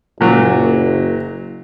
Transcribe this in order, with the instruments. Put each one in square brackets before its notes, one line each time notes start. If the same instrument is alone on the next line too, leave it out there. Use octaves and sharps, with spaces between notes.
[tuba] F#1 [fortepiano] A#2 F#3